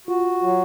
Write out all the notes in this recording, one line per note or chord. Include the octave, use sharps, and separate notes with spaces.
F4 F#4
F#3